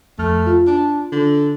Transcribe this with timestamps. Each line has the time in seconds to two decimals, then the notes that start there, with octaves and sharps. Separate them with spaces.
0.19 F2 A3 F6
0.47 F4
0.67 D4
1.12 D3